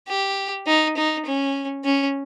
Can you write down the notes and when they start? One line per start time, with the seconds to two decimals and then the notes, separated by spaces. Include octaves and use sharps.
0.08 G4
0.67 D#4
0.97 D#4
1.25 C#4
1.84 C#4